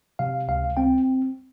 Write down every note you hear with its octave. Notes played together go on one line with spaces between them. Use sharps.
C3 F5
C#2 F5
C4 G5